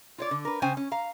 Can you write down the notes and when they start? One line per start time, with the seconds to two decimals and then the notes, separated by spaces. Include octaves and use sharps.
0.18 F4 C#5 D5
0.31 D3
0.45 A#4 B4
0.62 C#3 C#4 C5 G5 G#5
0.77 C#4
0.92 F5 A#5